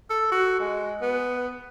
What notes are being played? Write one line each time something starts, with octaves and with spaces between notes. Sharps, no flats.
A4
F#4
G#3
B3